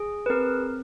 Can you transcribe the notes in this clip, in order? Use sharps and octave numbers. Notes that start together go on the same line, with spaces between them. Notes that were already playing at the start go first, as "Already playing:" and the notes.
Already playing: G#4
B4
C4 A#4